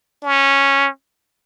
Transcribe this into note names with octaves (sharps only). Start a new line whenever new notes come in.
C#4